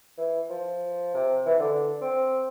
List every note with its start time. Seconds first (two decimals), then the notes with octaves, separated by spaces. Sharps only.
0.18 E3
0.50 F3
1.14 C3
1.46 E3
1.59 D3
2.01 C4